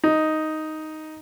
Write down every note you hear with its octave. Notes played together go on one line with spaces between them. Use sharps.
D#4